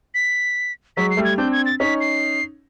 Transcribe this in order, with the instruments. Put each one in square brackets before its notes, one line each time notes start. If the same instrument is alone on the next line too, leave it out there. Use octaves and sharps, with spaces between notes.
[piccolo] B6
[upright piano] F#3 G#3 [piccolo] B6
[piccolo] C7
[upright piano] G3 A3
[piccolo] G#6
[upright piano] C4 D4 [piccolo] G6
[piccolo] G#6
A6
[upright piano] C#4 D#4 [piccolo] B6
[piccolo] C7